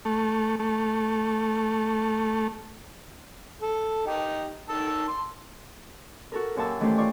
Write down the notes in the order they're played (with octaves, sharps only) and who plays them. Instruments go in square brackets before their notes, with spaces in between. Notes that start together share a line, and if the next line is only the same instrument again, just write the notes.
[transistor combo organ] A3
A3
[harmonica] A4
D#4 G4
D#3 A5 E6
C6
[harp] F#4 A4 A#4
F#2 A#2 F#4 G4 A5 E6
D#3 E3 A3 C#4 G4 C5
F4 D5 C#6